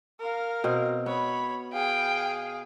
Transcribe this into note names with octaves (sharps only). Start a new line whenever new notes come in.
A#4 F5
B2 C4
B3 C#5 B5
G#4 F5 G5